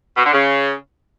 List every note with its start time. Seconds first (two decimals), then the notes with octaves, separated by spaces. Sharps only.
0.17 B2
0.25 D3
0.33 C#3